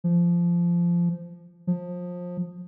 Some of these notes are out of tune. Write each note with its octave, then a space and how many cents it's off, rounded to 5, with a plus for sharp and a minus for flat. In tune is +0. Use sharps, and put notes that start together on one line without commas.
F3 -15
F3 +25